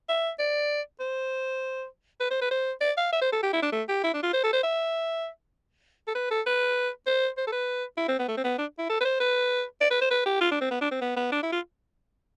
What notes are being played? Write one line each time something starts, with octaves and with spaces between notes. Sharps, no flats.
E5
D5
C5
B4
C5
B4
C5
D5
F5
E5
C5
A4
G4
E4
D4
A3
G4
E4
D4
F4
C5
A4
C5
E5
A4
B4
A4
B4
C5
C5
A4
B4
E4
C4
B3
A3
C4
B3
D4
E4
A4
B4
C5
B4
D5
B4
C5
B4
G4
F4
D4
C4
B3
D4
C4
B3
B3
D4
E4
F4